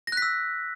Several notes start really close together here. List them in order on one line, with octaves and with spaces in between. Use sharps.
A#6 F#6 B6 E6